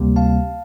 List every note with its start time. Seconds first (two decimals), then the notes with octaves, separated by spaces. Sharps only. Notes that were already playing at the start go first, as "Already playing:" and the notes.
Already playing: D2 C3 G3 A#3
0.16 F5 A5